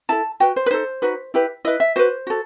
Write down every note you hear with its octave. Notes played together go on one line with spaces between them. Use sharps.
E4 A4 A5
F#4 B4 G5
C5
B4
D#4 A4 C5
D#4 F#4 B4
E4 G4 B4
E4 B4 D#5
E5
F#4 B4 C5
F#4 A4